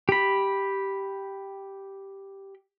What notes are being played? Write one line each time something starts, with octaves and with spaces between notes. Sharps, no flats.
G4 B5